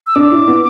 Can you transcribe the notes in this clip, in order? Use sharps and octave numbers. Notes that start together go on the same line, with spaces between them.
E6
D4 D6
E4
B3